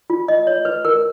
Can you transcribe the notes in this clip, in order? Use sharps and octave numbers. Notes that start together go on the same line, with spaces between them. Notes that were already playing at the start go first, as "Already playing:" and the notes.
F4
D#5
C#5
B4
A#4